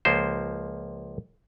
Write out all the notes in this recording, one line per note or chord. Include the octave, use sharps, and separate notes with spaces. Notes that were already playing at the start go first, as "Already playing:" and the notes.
C#2 F3 A#3 C5